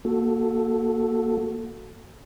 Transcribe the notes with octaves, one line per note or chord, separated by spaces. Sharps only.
A#3 F#4 A4